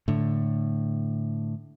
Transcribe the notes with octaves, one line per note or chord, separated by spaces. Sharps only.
A2 D3